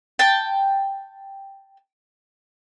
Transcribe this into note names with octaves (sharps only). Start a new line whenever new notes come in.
G5 A5